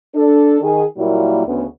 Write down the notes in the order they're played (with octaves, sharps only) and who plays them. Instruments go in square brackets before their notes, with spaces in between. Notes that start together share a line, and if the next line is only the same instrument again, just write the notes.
[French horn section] D4 A4
D#3 G#4
A#2 F#3 G3 A#3 E4
D2 C#3 B3